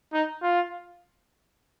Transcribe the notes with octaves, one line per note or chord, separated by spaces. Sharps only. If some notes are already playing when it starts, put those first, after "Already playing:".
D#4
F4